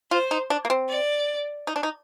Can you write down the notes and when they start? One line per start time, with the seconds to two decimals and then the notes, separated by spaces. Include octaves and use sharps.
0.11 F4 C5
0.31 D#4
0.50 D4
0.65 A#3
0.70 C4
0.89 D5
1.67 D#4
1.76 D4
1.83 D#4